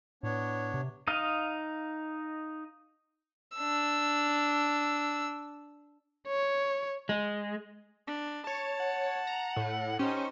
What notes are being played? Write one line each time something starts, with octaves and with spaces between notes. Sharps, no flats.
A2 B3 D4 C#5
C3
D#4 D#5 F5
D4 E6
C#5
G#3
D4
C#5 A5
F#5
A#5
A2
C#4 D#4 G4 C5